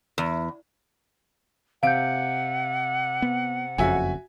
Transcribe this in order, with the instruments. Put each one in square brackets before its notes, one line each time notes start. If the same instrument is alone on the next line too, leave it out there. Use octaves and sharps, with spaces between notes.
[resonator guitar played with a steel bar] E2
[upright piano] C3 D7 [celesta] F5 G6 [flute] F#5
[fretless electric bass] B3
[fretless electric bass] F#1 F2 C#3 [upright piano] F#4 E5 G#5